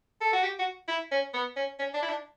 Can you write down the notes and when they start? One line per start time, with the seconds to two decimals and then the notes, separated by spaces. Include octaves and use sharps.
0.21 A4
0.33 F#4
0.43 G4
0.59 F#4
0.88 E4
1.12 C#4
1.34 B3
1.56 C#4
1.79 C#4
1.94 D4
2.03 E4
2.09 D4